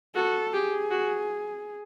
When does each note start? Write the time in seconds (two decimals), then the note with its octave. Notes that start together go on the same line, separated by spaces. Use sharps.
0.15 F#4 A4
0.53 G4 G#4
0.91 F#4